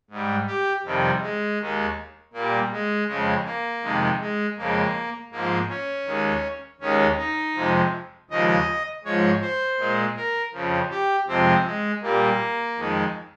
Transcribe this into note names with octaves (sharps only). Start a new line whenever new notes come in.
G#2 G3
G4
F2 C3 D#3 G3
G#3
D#2 D#3 G#3
A#2 G3 A#3
G#3
F2 C#3 G#3
A#3
F2 C3 D#3 G#3
G#3
F2 C#3 G#3 A#3
G#2 F3 G#3 A#3
C#4
D#2 D#3 G#3
D#2 D#3 G#3 C#4
D#4
F2 C3 F3 G#3
D#2 C#3 F3 G#3 D#5
G#2 F3 G#3 C#5
C5
A#2 G#3
A#4
F2 C#3 F3
G4
F2 C3 F3 G#3 C4
G#3
A#2 G3 A#3
F2 D#3 G#3